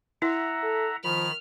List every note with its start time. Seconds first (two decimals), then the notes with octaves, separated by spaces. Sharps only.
0.22 E4 E5 F#5 A#5
0.63 A4
1.04 D#3 F3 B5 F6